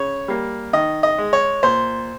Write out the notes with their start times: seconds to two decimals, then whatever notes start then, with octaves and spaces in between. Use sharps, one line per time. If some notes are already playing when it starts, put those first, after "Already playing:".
Already playing: C#3 C#5
0.28 G3 A#3
0.73 D#3 D#5
1.03 D#5
1.18 G#3
1.33 C#5
1.63 A#2 C5